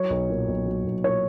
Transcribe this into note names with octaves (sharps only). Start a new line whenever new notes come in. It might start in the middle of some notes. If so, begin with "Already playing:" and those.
Already playing: F#3 C#5
B1
A#2
B1
F#3
B1
A#2 C#5